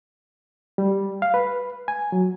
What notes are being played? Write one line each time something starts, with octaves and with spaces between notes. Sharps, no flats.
G3
F5
B4
G#5
F#3